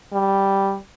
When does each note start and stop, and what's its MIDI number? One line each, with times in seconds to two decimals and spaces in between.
0.13 0.76 55